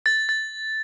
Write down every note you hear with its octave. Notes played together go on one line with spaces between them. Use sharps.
A6
A6